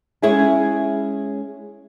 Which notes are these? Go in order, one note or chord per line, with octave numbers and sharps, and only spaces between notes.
G#3 C#4 E4 G#4 C#5